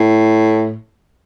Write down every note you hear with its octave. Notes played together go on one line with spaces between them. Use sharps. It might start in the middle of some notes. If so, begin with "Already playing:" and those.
Already playing: A2